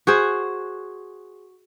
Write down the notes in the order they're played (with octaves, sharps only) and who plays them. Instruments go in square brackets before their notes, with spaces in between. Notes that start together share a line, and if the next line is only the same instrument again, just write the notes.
[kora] F#4 G#4 C5